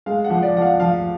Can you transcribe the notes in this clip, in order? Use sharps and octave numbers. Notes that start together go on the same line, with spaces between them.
G#3 F5
F#5
F3
D5
F3 F#5
F5
F3 F5